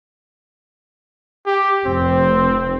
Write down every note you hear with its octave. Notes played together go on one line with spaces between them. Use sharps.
G4
F1 C4